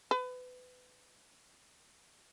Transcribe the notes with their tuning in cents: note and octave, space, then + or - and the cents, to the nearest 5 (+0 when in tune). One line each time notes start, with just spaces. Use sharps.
B4 +25